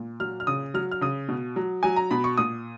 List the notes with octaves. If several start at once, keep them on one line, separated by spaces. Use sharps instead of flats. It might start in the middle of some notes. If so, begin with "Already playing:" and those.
Already playing: A#2
F#3 F6
F6
C#3 D#6
F#3 F6
F6
C#3 D#6
B2
F#3
F#3 G#5
A#5
B2 B5
C#6
A#2 D#6